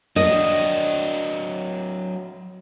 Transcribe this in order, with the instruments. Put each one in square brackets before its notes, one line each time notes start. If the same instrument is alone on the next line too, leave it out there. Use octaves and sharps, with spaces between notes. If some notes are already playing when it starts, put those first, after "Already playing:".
[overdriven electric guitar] F#3 D4 [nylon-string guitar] D#5